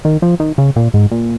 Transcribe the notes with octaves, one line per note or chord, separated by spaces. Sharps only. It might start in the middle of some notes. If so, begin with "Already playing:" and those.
D#3
F3
D#3
C#3
A#2
G#2
A#2